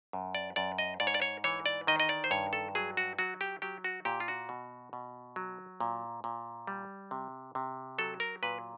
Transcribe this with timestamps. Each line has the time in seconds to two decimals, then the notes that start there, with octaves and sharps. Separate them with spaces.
0.13 F#2
0.35 D5
0.56 F#2 D5
0.79 D#5
1.00 G#2 D5
1.07 C#5
1.14 D5
1.22 C#5
1.44 E3 C#5
1.66 D5
1.87 D#3 D#5
2.00 D#5
2.09 D5
2.24 C5
2.31 G2 C#5
2.53 A4
2.75 F#3 G#4
2.97 F#4
3.19 F#3 F#4
3.41 G4
3.62 F#3 G4
3.84 F#4
4.05 A#2 G4
4.20 F4
4.28 F#4
4.49 B2
4.93 B2
5.36 F#3
5.80 A#2
6.24 A#2
6.67 G3
7.11 C3
7.55 C3
7.98 F#3 A4
8.20 A#4
8.43 A#2 B4